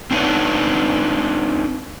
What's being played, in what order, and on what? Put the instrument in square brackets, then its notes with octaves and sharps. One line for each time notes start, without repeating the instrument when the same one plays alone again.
[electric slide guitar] C4 D4 D#4 B4 C#5